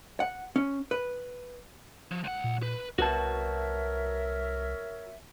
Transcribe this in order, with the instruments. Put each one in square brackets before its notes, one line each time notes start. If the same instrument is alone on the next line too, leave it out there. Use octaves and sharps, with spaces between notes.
[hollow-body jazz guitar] F#5
C#4
B4
[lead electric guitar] F3
C#2 F#5
[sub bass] A#2
[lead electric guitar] B4
[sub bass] C2 [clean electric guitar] F#4 B4 A5 [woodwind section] A#4 C#5 E5